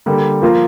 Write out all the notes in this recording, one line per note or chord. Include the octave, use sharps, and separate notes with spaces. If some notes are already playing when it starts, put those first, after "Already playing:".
D3 G3 A#3
F3 A#3 F4